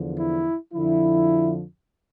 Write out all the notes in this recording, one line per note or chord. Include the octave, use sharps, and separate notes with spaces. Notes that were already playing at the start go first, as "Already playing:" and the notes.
Already playing: E2 D3 F3
E4
F2 D3 F3 E4